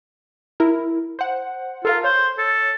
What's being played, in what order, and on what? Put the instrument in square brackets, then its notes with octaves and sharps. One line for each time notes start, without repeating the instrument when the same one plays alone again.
[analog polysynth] E4 A#4
C5 F#5
[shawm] F4 [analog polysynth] A4 A#4 F5
[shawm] C5 [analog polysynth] C#5
[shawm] A4